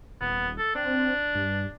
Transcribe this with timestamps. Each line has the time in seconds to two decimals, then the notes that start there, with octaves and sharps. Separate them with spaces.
0.21 D#1 B3
0.58 A4
0.75 C4 D4
1.35 G2